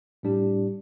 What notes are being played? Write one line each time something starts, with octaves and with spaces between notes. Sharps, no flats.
A2 G3 D4 G4